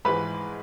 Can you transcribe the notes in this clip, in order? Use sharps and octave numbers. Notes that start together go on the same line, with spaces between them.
G#1 G#2 E3 G#3 B4 B5